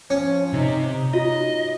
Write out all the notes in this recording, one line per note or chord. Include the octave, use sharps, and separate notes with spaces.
F3 C#4 C5
C3 D#4
F4 F#4 D#5